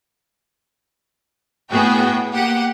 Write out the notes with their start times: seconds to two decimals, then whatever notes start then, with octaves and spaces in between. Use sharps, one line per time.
1.70 A2 B3 F#4 G#4 G5
2.33 A#3 G4 F#5